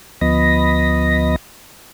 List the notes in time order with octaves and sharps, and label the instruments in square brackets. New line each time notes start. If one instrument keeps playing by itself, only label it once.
[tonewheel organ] D2 F3 B3 D#5 B5 A#6